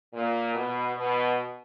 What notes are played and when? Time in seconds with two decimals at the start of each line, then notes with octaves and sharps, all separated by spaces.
0.14 A#2
0.54 B2
0.97 B2